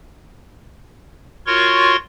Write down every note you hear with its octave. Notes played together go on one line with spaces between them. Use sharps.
F4 F#4 A#4 C#5 C6 C#6